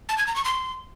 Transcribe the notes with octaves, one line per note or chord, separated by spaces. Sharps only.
A5
G#6
A#5
C#6
C6